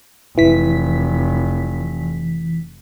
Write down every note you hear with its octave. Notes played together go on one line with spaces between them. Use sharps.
F1 E3 B6